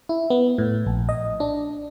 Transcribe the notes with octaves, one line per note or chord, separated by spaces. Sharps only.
E4
B3
A2
A#1
D#5
D4